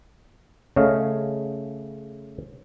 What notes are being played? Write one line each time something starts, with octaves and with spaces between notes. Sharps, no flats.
C#3 A3 C#5 D#5 F5